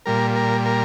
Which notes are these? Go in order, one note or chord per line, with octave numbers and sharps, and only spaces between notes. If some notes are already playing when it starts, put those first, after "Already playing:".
A#2 G3 A#4
A#4
A#4